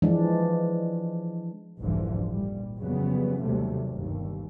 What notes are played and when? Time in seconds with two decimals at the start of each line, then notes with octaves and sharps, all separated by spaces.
0.02 E3 F3 G#3 D4
1.79 F1 C2 G#2 D3 E3 F3
2.28 A#2 G3
2.76 F2 C#3 F#3 G3 B3
3.42 D#2 C3 F#3 G3 A3
3.91 G1 D#2